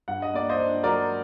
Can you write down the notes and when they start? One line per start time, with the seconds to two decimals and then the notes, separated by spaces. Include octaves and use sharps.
0.08 G2 F#5
0.22 D#5
0.33 A#3 D5
0.49 C5 D#5
0.59 D4
0.83 F#3 A#4 D5